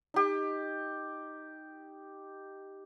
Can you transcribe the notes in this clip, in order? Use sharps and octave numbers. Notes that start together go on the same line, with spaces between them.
D#4 G4